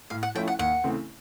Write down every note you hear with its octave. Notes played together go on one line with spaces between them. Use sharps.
A2 F5
F#5
F3 A3 C#4 E4 G5
F#5
D#2 F#5
C#3 E3 A3 C4